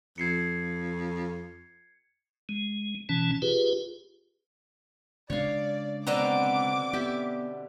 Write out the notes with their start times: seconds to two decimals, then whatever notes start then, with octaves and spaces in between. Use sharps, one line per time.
0.18 F2 G#6 C7 C#7
2.49 G#3
3.09 B2 E3 C#4 A5
3.42 F4 G4 G#4 B4
5.30 C#3 G#3 D4 C#5 D5 F5
6.07 B2 D3 F#3 C4 B4 A#5 D6
6.93 B3 G4 E5